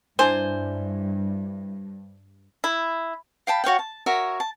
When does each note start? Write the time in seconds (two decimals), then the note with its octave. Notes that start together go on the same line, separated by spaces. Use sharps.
0.19 G2 D4 E4 C5 G#5
2.64 E4
3.47 F5 G5 A5 B5
3.64 F#4 C#5 F5 G5
3.79 A5
4.06 F#4 A#4 C#5 E5
4.40 A5